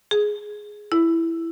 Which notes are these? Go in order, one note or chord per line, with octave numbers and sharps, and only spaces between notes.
G#4
E4